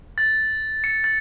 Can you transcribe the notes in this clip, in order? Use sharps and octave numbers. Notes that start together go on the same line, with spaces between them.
A6
C#7
A6